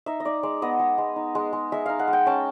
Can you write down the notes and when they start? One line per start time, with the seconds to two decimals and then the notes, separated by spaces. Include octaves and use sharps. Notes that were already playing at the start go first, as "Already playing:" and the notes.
0.06 D#4 E5
0.20 D#5
0.25 D#4 D5
0.43 G#3 D5
0.62 B3 D#5
0.80 G#3
0.98 G#3
1.16 D#4
1.35 G#3
1.53 G#3
1.72 G#3 E5
1.86 D#4 F5
1.99 F#5
2.08 G#3
2.13 G5
2.26 C#4 A5